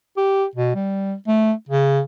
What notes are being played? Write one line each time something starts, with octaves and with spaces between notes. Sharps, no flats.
G4
B2
G3
A3
C#3